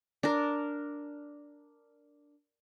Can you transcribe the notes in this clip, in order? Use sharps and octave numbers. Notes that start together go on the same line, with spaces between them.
D4 A#4